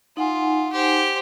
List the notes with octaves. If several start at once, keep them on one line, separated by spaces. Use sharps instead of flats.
D#4 F4 F#5 G#5
G4 C5